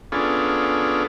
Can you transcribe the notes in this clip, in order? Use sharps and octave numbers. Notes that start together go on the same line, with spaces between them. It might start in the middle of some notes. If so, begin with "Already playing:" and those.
B3 C#4 D4 F4 G#4 A4